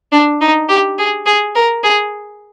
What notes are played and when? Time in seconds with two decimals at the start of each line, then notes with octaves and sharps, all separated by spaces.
0.12 D4
0.41 D#4
0.69 G4
0.98 G#4
1.26 G#4
1.55 A#4
1.83 G#4